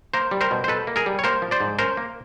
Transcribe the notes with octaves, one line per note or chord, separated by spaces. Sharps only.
A#3 A#4 C5
G3
A#4 C5
B2
C5
B2 A4 B4
A#3
G#4 A#4
G3
C#5
A#3 A#4 C5
F3
C5 D5
G#2
C#4 A#4 C5
A#3